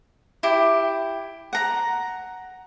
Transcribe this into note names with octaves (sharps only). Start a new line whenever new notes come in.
E4 G4
F#5 A#5